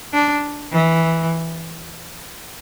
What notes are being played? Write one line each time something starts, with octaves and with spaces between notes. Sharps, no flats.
D4
E3